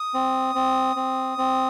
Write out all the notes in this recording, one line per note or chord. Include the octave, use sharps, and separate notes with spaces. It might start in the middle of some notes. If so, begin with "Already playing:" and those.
Already playing: D#6
C4
C4
C4
C4